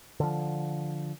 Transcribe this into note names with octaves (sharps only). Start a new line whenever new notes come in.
D3 F3